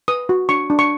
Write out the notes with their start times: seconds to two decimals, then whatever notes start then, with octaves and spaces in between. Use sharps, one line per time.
0.08 B4 D#6
0.29 F#4
0.49 D4 C#6
0.70 D4
0.79 C#6